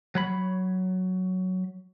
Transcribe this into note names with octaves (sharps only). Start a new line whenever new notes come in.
F#3 C#5 B5